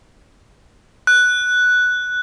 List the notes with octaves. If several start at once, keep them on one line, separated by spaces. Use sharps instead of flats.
F#6